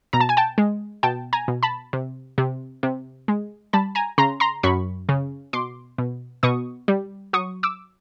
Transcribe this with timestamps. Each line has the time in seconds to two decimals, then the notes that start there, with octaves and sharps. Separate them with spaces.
0.13 B2 A#5
0.20 A5
0.29 G#5
0.37 G5 A5
0.58 G#3
1.03 B2 G5 A5
1.33 G#5 A#5
1.48 B2
1.63 A5 B5
1.93 C3
2.38 C3
2.83 C3
3.28 G#3
3.73 G3 A5 B5
3.95 G#5 A#5
4.18 C#3 A#5 C6
4.40 A#5 C6
4.63 F#2 B5 C#6
5.09 C#3
5.53 B2 C6 D6
5.98 B2
6.43 B2 C#6 D#6
6.88 G3
7.33 F#3 C#6 D#6
7.63 D6 E6